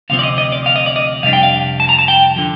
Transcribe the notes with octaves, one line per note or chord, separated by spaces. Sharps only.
D2 C3 F3 C4 F5
D5
D#5
D#5
D5
F5
D#5
D5
D#5
F2 C3 G3 D4 F5
G5
F5
A5
A#5
A5
G5
D3 F3